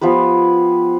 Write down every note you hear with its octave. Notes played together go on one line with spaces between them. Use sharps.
F3 B3 G4 B4